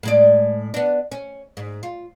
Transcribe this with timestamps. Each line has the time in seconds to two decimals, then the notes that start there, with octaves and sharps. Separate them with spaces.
0.03 A2 G#3 D5
0.74 B3 D4
1.12 C#4
1.57 G#2
1.83 F4